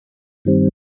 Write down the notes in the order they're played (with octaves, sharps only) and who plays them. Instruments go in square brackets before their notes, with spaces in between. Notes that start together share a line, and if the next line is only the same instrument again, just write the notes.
[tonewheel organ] G2 D#3 G3 C4